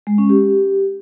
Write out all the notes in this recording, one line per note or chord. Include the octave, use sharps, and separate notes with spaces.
G#3
C#4
G4